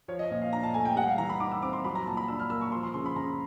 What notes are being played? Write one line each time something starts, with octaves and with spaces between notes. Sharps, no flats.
F3 C#5
D#5
A#2
F5
D4 A#5
A5
A3 G#5
G5
G3 F#5
F5
E3 A#5
B5
D#4 D6
E6
C4 D6
C6
F#3 B5
A#5
A#2 A5
B5
D4 E6
F6
A#3 E6
C#6
F3 C6
C6
C#3 C6
B5
C#3 A#5